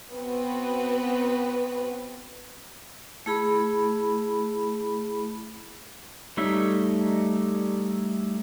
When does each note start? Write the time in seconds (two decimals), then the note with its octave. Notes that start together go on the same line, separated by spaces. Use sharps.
0.13 B3 C4 F#4 B4
3.26 A3 E4 G#4 B5
6.37 G3 A3 D#4 C#5 E5